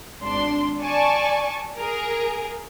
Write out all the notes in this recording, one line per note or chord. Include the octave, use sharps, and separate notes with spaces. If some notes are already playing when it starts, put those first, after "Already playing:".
G#1 D4 C6
D5 G#5 A5 C#6
G#4 A#4